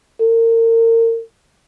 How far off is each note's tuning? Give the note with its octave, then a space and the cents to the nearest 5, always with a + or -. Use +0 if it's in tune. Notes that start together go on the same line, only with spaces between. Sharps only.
A#4 -35